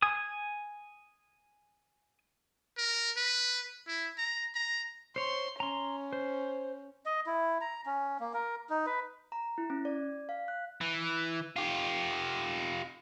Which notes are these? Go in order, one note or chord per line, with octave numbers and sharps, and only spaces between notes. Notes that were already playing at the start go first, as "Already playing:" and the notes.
G#5 D#6
A#4
B4
E4
A#5
A#5
C5 C#5 C6
C#4 A#5 C6
C5
D#5
E4
A#5
C#4
A#3
A#4
D#4
B4
A#5
E4
C#4
D5
F5
F#6
E3
F4 G4